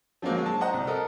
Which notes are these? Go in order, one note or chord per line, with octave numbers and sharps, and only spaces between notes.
F3 F#3 G#3 A#3 C4
F#3 G#3
A5
C5 D#5 F#5 A#5
C2
A4 A#4 D#5